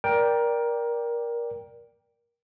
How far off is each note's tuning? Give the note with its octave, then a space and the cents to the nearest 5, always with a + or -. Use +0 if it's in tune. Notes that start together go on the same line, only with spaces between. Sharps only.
A#4 +20 D5 +0 G5 +0